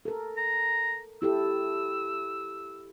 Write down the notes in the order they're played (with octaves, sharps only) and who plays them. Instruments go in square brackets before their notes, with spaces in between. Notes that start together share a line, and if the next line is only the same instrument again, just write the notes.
[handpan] A4 A#4
[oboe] A#5
[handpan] E4 G4 A4 [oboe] E6